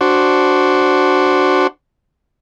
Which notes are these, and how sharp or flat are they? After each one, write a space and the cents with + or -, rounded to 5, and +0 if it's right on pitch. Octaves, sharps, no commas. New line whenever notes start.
D4 -5 F#4 +0 C5 +0